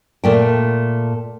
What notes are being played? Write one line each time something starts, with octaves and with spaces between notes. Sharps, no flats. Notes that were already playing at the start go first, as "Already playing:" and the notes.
A#2 A3 G5